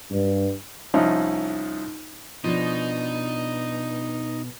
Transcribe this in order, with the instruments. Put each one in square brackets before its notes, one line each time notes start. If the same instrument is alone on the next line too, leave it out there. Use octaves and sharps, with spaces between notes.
[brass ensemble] G2
[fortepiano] C2 F3 C#4 D#4 E4 D#5
[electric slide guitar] B2 [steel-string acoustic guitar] F3 D4 [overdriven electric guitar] D#4